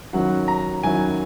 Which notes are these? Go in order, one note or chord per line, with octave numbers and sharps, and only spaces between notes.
D#3 F#3 C#4 E4 F#5
A#5
D#3 F#3 C#4 E4 G#5